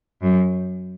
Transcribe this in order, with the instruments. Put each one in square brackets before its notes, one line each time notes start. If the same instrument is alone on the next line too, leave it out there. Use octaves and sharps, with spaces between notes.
[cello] F#2